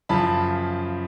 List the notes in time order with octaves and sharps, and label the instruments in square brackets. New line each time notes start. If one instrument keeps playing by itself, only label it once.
[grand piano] F#2 C#3 F3 A5 B5